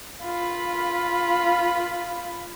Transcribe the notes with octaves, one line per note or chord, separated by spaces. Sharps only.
F4 B5